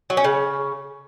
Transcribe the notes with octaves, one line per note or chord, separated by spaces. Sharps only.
F#3
C#4
C#3